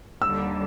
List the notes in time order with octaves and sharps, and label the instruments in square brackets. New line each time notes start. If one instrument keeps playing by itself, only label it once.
[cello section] D#2 D3 G3 [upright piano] E6